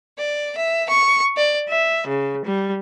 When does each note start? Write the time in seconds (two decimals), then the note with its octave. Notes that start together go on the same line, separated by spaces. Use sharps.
0.20 D5
0.57 E5
0.90 C#6
1.37 D5
1.68 E5
2.07 C#3
2.44 G3